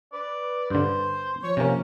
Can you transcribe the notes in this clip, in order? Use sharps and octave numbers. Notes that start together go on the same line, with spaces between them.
B4 D5
G2 D3 C5
F3 C#5
C3 A#3 C#4